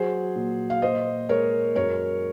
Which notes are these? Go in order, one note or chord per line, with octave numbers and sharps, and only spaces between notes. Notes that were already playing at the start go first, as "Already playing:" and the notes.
Already playing: F#3 G#4 C5
A#2
F5
A#2 C5 D#5
G#3 A#4 C#5
F#2 A#4 C#5